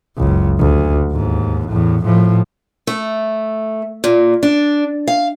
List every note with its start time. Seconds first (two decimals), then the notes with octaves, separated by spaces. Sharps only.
0.17 F#1 C#2
0.59 D2
1.12 D#2 G#2
1.68 E2 A2
2.03 A2 F3
2.87 A3
4.04 A#2
4.43 D4
5.08 F5